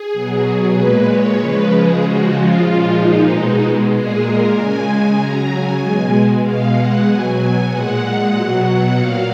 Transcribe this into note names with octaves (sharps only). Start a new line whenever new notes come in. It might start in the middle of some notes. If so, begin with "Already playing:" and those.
Already playing: G#4
B2 F#3
A#2 G#3 B4
C#5
C#3 F3 G#3 B4
G#4
C#3 F3 G#3 F#4
F4
A#2 F3 G#3 F4
D#4
B2 G#3 D#4
A#2 G#3 G#4
A#4
C#3 G#3 G#5
C#3 F#3 A#5
G#5
B2 G#3
B2 G#3 F5
F#5
B2 F#3 G#5
G#5
A#2 G#3 F#5
B2 F#3
F#5
A#2 F#3 F5